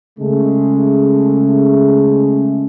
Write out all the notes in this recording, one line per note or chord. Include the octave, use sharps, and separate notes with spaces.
C#3 G#3 A3